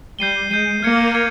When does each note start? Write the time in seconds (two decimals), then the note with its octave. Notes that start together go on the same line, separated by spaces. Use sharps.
0.19 G3 G6 C7 D#7 G7
0.50 G#3 G6 C7 D#7 G7
0.83 A#3 F6 G#6 C#7
1.15 F6 G#6 C#7